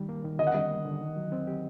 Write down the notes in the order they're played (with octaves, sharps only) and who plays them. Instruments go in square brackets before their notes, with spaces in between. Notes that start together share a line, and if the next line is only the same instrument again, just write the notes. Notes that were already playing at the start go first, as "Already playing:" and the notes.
Already playing: [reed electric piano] D#3 G3
A#3
D#3
[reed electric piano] D3 [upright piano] D#5
[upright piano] F#5
[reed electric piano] G3 [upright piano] D#5
[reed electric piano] A#3
D3
D#3
F#3
C4
G4